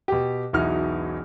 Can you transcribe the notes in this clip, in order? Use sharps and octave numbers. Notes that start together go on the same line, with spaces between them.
B2 G4
E1 B1 E3 D#4 F#4 F6